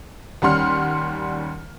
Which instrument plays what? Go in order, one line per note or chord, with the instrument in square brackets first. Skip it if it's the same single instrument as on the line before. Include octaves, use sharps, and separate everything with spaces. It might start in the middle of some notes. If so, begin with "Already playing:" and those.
[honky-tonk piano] D#2 G3 C#4 F#5 C6 F6